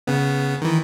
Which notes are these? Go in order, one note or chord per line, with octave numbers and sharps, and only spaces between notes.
C#3 B3
D#3 E3